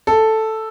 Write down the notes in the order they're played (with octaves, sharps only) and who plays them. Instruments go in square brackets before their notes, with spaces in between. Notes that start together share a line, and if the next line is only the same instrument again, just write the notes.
[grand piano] A4